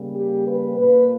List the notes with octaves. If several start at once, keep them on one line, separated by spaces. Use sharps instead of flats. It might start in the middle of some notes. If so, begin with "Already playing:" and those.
Already playing: C#3 G3 A#3
G4
B4
A#2 A#3 B4